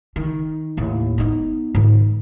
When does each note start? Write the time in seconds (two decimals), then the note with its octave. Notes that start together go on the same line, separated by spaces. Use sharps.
0.16 D#3
0.77 D#2 A2
1.18 B3 D#4
1.75 G#2 D#3